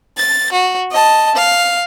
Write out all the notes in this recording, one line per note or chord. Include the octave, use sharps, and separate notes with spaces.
A6
F#4
D#5 A5
F5